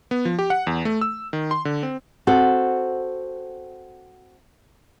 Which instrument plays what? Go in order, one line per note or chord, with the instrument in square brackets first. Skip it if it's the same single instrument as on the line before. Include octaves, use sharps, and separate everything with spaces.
[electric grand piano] B3
F3
G4
F#5
E2
A3
E6
D#3
C6
D3
C4
[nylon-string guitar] C4 F#4 A4